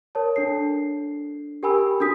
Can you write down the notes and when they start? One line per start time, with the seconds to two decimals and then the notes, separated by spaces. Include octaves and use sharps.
0.15 A#4 C#5 A5
0.36 D4 A4 C7
1.63 G4 A#4 G5 G#5 B5 E6
2.00 D4 F#4 A4 D#6 B6